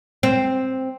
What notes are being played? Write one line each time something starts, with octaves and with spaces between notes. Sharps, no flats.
C4